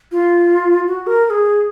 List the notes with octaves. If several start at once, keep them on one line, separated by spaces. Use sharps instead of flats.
F4
F#4
A#4
A#4
G#4